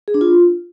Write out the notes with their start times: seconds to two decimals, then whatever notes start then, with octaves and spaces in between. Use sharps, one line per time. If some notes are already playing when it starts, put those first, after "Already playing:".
0.08 G#4
0.14 D4
0.21 F4